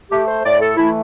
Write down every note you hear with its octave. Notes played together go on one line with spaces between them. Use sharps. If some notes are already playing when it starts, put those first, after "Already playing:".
A3 G4
C5
A2 D5
A4
E3 A3 E4